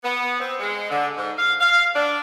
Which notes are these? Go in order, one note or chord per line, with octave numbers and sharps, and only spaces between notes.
B3
C4
G#3
D3
G#2
F5
F5
D4